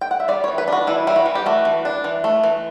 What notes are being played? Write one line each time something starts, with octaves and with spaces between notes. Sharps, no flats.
G5
F#5
E5
G3 D5
C#5
E3
B4
D4 F#4
E3 E4
G3 E4
F#4
E3
G4
A3 F#4
E3
D4
E3
A3
E3